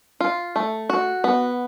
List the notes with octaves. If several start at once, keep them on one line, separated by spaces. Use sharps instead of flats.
F4
A3
F#4
B3